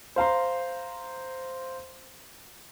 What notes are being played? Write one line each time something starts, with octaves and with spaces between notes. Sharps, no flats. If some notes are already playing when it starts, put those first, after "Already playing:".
C5 F5 A#5 C6